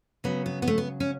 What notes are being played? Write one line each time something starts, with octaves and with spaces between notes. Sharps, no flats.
C#3 F#3 B3
B3
B3
A3
B3
C#4